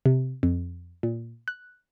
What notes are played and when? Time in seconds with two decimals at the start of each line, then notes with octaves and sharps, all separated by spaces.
0.06 C3
0.43 F2
1.03 A#2
1.48 F#6